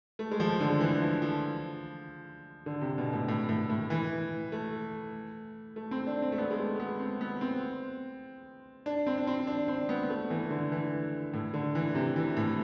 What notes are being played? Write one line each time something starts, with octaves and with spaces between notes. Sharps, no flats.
A3
G#3
F3
D3
E3
F3
F3
D3
C3
B2
A2
A2
A2
A2
E3
A3
A3
C4
D4
C4
A3
B3
G#3
A3
B3
C4
B3
C4
D4
C4
D4
C4
D4
C4
B3
B3
A3
E3
D3
E3
A2
D3
E3
C3
E3
A2